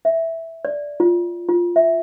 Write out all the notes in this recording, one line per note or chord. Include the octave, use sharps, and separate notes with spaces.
E5
D5
F4
F4
E5